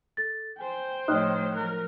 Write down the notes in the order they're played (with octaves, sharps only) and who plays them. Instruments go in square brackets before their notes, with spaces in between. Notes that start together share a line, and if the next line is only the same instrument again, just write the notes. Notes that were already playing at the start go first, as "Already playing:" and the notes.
[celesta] A4 A6
[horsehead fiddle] C5 G5 [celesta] G#5
[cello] A2 F3 [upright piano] D#4 C#5 [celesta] D#6 F6 F#6
[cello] F3 F#3 [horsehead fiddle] A#4 [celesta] F#6